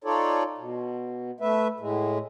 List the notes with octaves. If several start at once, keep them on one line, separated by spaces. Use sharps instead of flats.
D#4 F4 A4 C#5 D5
B2
A3 B4 E5
A2 G#3